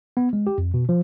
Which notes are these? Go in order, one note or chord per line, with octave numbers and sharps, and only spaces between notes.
B3
G#3
G4
F2
B2
F3